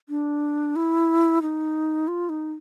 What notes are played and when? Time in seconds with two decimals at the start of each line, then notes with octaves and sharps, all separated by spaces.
0.09 D4
0.76 E4
1.42 D#4
2.08 F4
2.29 D#4